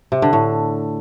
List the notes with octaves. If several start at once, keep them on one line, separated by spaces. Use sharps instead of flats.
C3
D3
A2